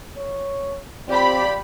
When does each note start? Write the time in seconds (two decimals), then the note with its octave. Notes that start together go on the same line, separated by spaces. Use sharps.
0.17 C#5
1.08 F3 C4 F4 G4 D5 B5